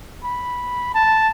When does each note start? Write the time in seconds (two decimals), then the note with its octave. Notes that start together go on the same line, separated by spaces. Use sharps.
0.24 B5
0.95 A5